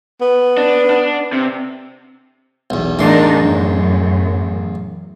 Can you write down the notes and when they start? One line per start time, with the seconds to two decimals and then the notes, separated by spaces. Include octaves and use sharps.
0.21 B3
0.57 D4
0.90 D4
1.33 C3
2.70 B1 E2
2.99 A1 E2 D4 D#4 A#4 C6
3.39 F#2